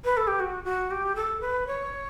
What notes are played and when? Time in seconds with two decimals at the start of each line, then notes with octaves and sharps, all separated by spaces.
0.05 B4
0.17 A4
0.27 G4
0.40 F#4
0.64 F#4
0.91 G4
1.15 A4
1.40 B4
1.67 C#5